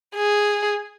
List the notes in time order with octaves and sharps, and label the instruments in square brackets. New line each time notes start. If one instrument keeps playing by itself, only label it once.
[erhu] G#4